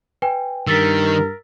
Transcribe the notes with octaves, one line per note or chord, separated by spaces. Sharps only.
B4 G5 G#5
G2 D#3 A#4 E6 A6 B6